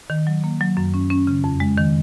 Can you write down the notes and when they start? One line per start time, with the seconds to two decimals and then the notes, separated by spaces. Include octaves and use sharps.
0.10 D#3
0.27 F#3
0.44 A#3
0.61 F#3
0.77 F#2
0.94 C#4
1.10 C#4
1.27 C#3
1.44 F2
1.60 G#3
1.78 D#3